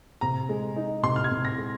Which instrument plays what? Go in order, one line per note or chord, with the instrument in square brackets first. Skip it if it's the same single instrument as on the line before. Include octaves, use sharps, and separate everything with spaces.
[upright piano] C3 A#5
G#3
D#4
C3 C6
F6
G#6
C3
A#6
G#3